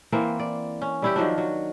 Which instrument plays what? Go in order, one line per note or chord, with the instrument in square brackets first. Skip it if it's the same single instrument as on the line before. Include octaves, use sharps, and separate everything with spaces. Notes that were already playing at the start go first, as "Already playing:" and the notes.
[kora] E3 A#3 C4
D5
C#4
G3 E4 G4
D#3 F3 F#3 D4
F#3